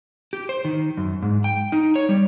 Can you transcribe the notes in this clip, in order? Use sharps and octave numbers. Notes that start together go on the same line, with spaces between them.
G4
C5
D#3
F#2
G#2
G5
D#4
C#5
G3